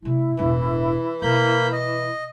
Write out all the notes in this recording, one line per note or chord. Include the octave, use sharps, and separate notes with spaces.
C3 A3 E4
E1 A1 E3
B2 A#3 B5 G6
D#5